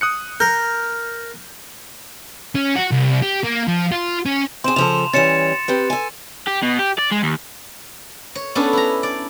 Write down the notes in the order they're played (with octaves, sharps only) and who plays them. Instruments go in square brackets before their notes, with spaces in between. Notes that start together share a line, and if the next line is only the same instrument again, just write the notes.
[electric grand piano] D#6 F#6 C#7
[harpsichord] A#4 [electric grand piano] G6
[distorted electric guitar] C#4
F#4
C2
G4
A#3
F3
F4
C#4
[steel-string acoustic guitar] C4 G#4 [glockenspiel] C6 E7
[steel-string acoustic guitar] C#3 F3 A4 [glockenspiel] F7
[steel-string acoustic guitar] E3 G3 C#4 [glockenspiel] A6 C#7 E7
[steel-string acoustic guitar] C4 G4 B4
A4 G#5
[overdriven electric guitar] G4
B2
G4
D5
G#3
D#2
[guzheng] C#5
B3 C#4 D4 A4
E4 A#5
D5